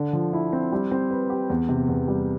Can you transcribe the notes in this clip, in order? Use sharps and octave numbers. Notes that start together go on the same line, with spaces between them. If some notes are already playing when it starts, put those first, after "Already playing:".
Already playing: D3
F3
E4
C4
G3
C4
B4
G4
E2
C3
E2
G3